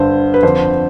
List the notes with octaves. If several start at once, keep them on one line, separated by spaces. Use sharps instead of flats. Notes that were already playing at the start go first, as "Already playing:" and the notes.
Already playing: G2 D3 C5
B4
F2 D3 C5